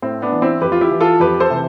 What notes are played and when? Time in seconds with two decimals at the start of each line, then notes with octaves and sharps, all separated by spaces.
0.02 A2 C4
0.22 B3 D4
0.32 E3
0.42 C4 E4
0.62 F2 G4 B4
0.72 F4
0.81 E4 G4
0.91 E3
1.00 F4 A4
1.20 F2 G4 B4
1.40 A4 C5
1.50 C3 E3